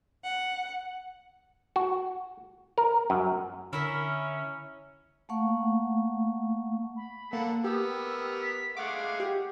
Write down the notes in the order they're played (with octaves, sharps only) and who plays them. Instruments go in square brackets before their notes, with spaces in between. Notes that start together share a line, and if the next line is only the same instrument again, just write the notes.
[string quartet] F#5
[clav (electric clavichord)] F#4
A#4
F#2
[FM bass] D3 [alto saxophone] C#4 [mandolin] E4 A#4 E5
[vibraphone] A3 A#3 F5 F#5 C#6
[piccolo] B5
[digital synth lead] A#3 [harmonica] A4 F#5
[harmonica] B3 A#4 [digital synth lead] G4 [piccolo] E6
[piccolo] B6
[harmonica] G#3 A3 F5 [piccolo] F#5 [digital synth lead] D6
[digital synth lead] G4